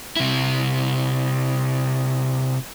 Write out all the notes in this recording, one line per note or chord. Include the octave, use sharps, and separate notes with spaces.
C3 E4